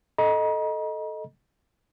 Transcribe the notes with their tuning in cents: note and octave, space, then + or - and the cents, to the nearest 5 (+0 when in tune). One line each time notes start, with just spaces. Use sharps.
A4 -5 D#5 +0 A#5 +40